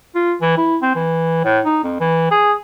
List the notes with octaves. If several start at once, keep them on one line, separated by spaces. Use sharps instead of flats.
F4
E3
E4
C4
E3
A2
D#4
F2
E3
G#4